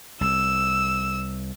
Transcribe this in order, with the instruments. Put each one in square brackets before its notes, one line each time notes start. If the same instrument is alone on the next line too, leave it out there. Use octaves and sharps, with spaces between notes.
[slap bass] C2 [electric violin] E6